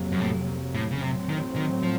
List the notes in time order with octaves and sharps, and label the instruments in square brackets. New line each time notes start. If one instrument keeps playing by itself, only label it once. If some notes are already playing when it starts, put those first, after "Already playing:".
Already playing: [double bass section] F2 C3 F#3 A#3
[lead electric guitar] F#2
A2
A2
C#3
[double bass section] A2 F#3 C4 [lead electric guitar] C3
[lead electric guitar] D#3
D#3
F3